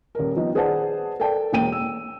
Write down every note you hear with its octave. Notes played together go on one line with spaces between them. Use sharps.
D#1 A#4
D#3 F3 B3 D#4
G#4 B4 C5 D5 F#5 A5
A4 A#4 D5 G5 A5
E1 A#3 G5 D#7
E6